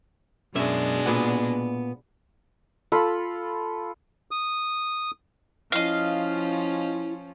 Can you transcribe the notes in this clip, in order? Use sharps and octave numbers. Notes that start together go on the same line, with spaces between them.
F#2 B2 G#3 C#4 D4 E5
A#2 B3 F#5
F4 A4 B5
D#6
F3 C#4 E4 D#5 F5